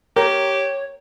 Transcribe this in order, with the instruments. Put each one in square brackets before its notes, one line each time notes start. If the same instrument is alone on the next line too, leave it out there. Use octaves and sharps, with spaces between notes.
[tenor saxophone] G4 [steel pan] A#4 [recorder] C#5